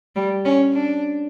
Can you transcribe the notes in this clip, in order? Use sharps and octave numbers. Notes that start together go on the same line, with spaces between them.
G3
C#4
D4